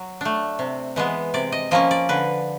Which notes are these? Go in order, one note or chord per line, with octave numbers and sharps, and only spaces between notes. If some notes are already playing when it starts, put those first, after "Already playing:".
Already playing: F#3
A3 D4
C3
E3 G#3 B3
C3 D5
D#5
F3 A#3 C#4 D#5
D5
D3 B4